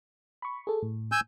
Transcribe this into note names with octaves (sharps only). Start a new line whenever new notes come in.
B5 C#6
G#4 A4
A2
G#5 E6 G6